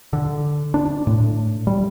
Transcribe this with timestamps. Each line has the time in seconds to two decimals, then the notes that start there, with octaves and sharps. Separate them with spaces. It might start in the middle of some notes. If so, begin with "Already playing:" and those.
0.13 D3
0.74 D4
1.07 A2
1.67 G3